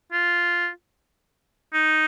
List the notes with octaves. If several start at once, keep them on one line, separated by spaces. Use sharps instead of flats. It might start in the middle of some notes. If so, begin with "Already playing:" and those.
F4
D#4